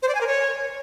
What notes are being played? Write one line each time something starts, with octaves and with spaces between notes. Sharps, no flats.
C5
D5
G#5
A#4
C#5